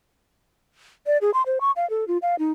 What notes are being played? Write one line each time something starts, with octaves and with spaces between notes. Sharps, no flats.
D5
G#4
C6
C5
C#6
F5
A4
F4
F5
D#4